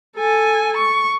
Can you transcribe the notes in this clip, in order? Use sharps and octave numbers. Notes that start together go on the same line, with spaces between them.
A4 G#5
C#6